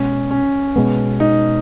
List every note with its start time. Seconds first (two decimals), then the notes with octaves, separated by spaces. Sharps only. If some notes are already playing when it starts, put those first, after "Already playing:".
Already playing: B2 G#3 C#4
0.31 C#4
0.76 B2 G#3 B3
1.20 D#4